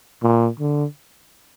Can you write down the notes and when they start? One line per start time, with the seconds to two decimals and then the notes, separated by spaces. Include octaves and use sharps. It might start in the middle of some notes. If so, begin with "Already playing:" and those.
0.23 A#2
0.60 D3